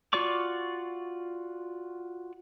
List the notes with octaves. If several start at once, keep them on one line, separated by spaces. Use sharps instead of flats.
F4 F#4 D5 C#6 D6